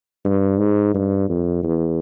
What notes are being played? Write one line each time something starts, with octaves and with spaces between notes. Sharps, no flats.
G2
G#2
G2
F2
E2